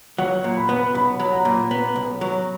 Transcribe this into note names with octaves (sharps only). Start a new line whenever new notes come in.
F#3 F#5
A#2
B5
B3
B5
B1 B5
F#3
A#5
A#2
B3
B1
F#3